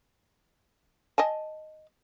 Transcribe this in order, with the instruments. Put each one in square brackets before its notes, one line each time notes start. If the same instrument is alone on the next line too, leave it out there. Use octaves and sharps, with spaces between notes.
[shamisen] D#5 G#5 A5